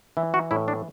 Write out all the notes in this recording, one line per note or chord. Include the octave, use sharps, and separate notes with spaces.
E3 E4
F#4
A2 E4
D4